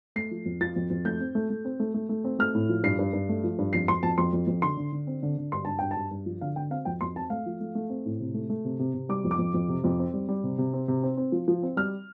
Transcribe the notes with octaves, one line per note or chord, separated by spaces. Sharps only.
A3 C7
F3
F2
F3 A6
F2
F2
A3 G6
C4
A3
A3
C4
A3
A3
A3
C4
A3 F6
A2
F3
G2 C7
G2
G2
A3
F3
G2
F2 C7
F2 C6
F2 A5
F2 C6
F2
F2
D3 C6
D3
D3
C4
D3
D3
G2 C6
G2 A5
G2 G5
A5
G2
G2
F3
D3 F5
D3 G5
C4 F5
F2 G5
F2 C6
C4 A5
A3 F5
F3
A3
A3
C4
A2
C3
A3
A3
C3
C3
C3
G3 D6
F2
D6
F2
F2
C3
F2
C4
G3
G3
C3
C3
C4
C3
C4
C4
F3
F3
C4
G3 F6